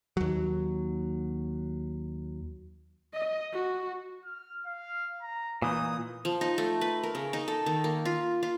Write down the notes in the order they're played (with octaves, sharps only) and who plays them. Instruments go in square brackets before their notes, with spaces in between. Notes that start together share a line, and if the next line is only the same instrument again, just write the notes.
[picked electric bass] D#2 F#3
[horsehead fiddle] D#5
F#4
[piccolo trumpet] F6
F5
A#5
[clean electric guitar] A#2 E3 [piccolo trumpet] D#4 [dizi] D#6
[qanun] F3
D#4
A3
B4
A#4
C#3
D#4
A4
D#3
A#3
F4
F4